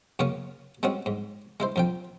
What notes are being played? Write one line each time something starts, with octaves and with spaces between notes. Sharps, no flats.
F#2 C#3 A#3 C#4 C#5 D#6
G#3 C4 C#4 F#4 G#4
G#2
G#3 E4 C5
F2 F3 G5